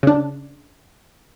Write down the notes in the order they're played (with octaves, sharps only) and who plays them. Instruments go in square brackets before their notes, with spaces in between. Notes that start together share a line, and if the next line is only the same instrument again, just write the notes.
[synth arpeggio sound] C#3 D4